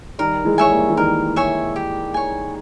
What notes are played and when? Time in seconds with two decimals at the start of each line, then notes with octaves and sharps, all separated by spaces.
0.19 D#3 G3 A#4
0.45 E3 G#3
0.58 C#5 E5 G#5
0.71 G3 A#3
0.89 E3
0.97 D#3 G3 A#4
1.36 C#5 E5 G#5
1.76 G4
2.14 C#5 G#5